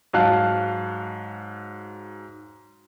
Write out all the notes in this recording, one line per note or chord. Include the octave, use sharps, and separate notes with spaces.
G#2 F#3 F5 A5 F#6